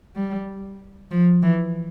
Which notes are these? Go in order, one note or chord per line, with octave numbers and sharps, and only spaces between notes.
G3
F3
E3